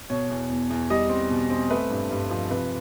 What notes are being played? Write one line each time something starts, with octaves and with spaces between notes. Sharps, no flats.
B2 C#5
E2
E2
E2
G3 D#5
C4
B2
C4
A3 B4
G2
G2
F3
C3 B4